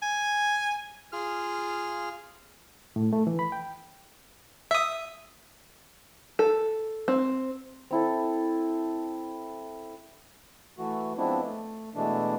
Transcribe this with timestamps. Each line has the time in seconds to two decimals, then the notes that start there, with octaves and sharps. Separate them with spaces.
0.02 G#5
1.12 F4 G#4 F6
2.96 A2
3.13 A3
3.27 E3
3.39 B5
3.52 G5
4.71 E5 D#6
6.39 A4
7.08 C4
7.91 C4 E4 A4
10.79 E3 A3 F#4
11.18 F3 G#3 B3 C4 D4 E4
11.44 A3
11.95 B2 E3 G#3 A3 D4